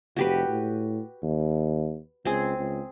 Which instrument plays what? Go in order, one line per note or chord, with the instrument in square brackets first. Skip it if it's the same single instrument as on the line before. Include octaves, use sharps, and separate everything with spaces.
[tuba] F1 [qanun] F#4 G4 B4
[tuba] A2
D#2
[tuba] C#2 [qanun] C4 G#4
[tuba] C#2